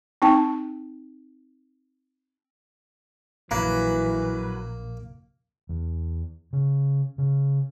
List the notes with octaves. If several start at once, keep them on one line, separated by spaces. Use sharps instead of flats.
C4 D#4 G5 A5
A#1 E3 F#3 A#3 B4
E2
C#3
C#3